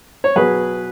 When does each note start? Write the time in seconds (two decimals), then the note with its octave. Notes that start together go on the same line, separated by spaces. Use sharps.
0.24 C#5
0.36 B2 F#3 G#4 B4